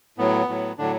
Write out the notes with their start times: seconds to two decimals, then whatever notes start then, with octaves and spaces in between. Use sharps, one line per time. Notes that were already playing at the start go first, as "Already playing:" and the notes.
0.18 A2 F#3 B3
0.49 A2 F#3
0.78 A2 D3 F#3 D4